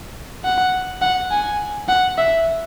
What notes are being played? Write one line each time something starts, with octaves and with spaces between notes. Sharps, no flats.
F#5
F#5
G#5
F#5
E5